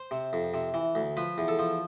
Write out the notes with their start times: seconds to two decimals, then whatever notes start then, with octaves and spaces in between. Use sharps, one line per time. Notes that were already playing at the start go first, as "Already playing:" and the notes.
Already playing: C5
0.11 C3
0.33 F2
0.54 C3
0.74 E3
0.95 D2
1.17 F3 B4
1.38 E2
1.48 A4
1.59 F3